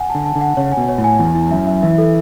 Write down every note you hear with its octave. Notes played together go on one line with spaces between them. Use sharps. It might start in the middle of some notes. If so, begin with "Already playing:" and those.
Already playing: F#5 G#5
D3 A5
A5
D3
F#5
C#3 C#5
G#5
B2
C#5
A2
G#5
E2 E4
E4
F#2 E5
E5
E3 E5
A4